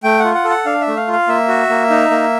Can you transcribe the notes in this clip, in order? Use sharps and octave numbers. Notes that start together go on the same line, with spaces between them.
A3 G5
F4 F#5
F#5
A4
F#5
D4 F5
E5
A3
F5
F4
F5
A#3 E5
F#4
A#3
D#4
A#3